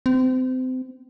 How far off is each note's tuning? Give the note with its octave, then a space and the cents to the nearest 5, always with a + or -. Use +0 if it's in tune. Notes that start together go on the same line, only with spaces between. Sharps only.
C4 -30